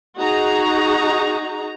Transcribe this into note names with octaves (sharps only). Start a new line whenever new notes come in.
D#4 F#4 G#4 A#5